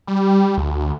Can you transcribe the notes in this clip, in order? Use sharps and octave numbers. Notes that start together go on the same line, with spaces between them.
G3
D2